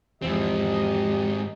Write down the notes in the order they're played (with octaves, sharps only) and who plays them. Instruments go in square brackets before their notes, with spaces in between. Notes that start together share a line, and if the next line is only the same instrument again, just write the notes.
[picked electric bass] E2 E3 F3 [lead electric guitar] G#2 C4 [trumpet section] D#4 D#5 [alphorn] G4